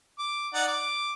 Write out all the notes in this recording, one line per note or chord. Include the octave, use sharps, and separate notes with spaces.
D6
D#4 D5 F#5
D6